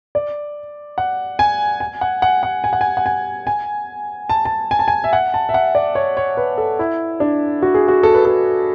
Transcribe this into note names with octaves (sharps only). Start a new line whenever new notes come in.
D5
F#5
G#5
G#5
F#5
F#5
F#5
G#5
F#5
G#5
F#5
G#5
G#5
A5
A5
G#5
A5
G#5
E5
F#5
A5
E5
F#5
D5
C#5
C#5
B4
A4
E4
D4
F#4
G#4
F#4
A4
B4
A4